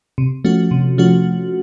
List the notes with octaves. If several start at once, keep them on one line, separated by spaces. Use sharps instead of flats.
C3
F3 A3 C#4 F#4
C3
F3 A3 C#4 F#4